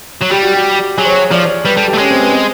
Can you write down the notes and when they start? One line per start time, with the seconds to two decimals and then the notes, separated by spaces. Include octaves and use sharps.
0.22 F#3
0.31 G3 G4
0.43 F#4
0.54 G4
0.98 F#3 G#4
1.05 C5
1.10 C#5
1.31 F3 D5
1.43 C#5
1.65 G3 B4
1.76 G3 A4
1.88 G4
1.94 A3
1.98 G#3 C#4
2.10 C4
2.21 B3
2.32 C4